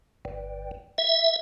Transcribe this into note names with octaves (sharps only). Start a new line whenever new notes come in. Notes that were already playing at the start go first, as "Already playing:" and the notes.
G1
E5